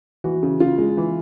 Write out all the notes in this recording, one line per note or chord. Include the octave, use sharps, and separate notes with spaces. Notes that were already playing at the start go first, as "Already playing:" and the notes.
E3 F#4
C#3
C#3 F4
G#3
E3